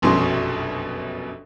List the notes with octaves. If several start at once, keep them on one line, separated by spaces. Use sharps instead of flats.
F1 A#1 F#2 B2 F#3 C6